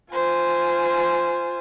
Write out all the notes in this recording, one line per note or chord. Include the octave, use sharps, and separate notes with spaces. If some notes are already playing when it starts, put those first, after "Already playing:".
F4 C5 G#5